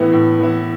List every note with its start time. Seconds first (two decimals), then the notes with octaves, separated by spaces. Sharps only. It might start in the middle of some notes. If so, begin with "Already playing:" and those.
Already playing: A2 E3 B3 E4
0.12 A2
0.39 E3 B3 E4